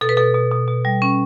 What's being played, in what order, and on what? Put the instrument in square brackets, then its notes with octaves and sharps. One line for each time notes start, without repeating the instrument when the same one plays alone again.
[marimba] B2 A4
B4
B2 A4
B2
B2
B2
G3
C#4